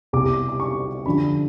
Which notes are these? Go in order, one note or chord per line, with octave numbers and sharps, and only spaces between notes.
C2 B2 G3 D6
D6
C#6
F#2 D3 F3 B5